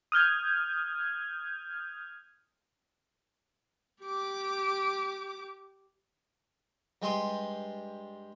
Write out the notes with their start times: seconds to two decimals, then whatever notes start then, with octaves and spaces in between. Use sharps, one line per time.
0.12 D#6 F6 G6 G#6
4.02 G4 D6
7.02 G2 G#3 G4 C6 D#6